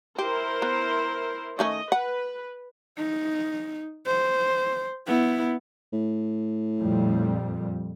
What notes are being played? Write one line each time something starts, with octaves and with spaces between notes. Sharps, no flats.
E4 G4 A#4 C5
B3
D#3 A3 C#4 D#5
B4 F#5
D#4
C5
B3 E4
A2
F2 A#2 G3